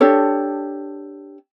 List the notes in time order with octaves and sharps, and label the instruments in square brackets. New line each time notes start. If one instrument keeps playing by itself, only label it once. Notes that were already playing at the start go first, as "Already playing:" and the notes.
[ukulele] D4 G4 A4 C#5